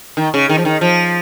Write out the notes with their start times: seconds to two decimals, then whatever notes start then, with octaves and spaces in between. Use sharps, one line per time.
0.17 D#3
0.34 C#3
0.49 D#3
0.58 F3
0.65 D#3
0.81 F3